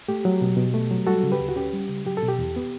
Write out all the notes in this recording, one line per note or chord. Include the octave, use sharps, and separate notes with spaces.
A3 G4
F#3
B2
B2
A3
F#3
G3 F#4 A4
C#3
G4 B4
D2
F#4
C#4 G4
G3
C#3
F#3 G4
A4
B2
G4
E2
B3